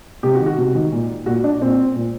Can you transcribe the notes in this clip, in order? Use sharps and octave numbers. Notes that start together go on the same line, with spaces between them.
C3 G4
F#4
D#3
F#4
C3
D#3
A#2
A#2 F#4
D4
A#2 C4
A#2